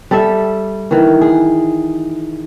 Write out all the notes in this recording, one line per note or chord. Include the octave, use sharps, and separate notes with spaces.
G3 A4 E5
D#3 E3
G#4